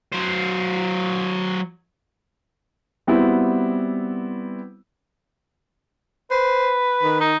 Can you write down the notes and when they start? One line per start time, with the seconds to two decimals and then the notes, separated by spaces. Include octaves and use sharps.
0.13 F#3 C5
3.07 G3 B3 C4 E4 F#4
6.31 B4 C5
7.03 D#3
7.21 D#4